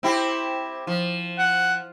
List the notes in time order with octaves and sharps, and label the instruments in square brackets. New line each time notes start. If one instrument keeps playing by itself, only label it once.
[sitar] C4 E4 G4
F3
[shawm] F#5